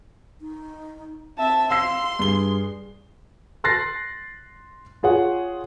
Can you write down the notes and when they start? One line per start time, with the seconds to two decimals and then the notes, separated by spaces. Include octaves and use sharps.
0.41 D#4
1.38 C4 E5 A5
1.70 F5 C6 E6 C7
2.19 G2 G#4 G7
3.64 C6 F#6 A6 A#6 C7
5.03 F4 G#4 C#5 F#5